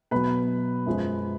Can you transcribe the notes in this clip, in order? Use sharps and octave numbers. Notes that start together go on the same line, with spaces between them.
B2 F#3 B4 B5
F#2 F3 G#3